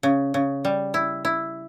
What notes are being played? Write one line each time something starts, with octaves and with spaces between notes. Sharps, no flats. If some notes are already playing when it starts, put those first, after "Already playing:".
C#3
C#3
G3
E4
E4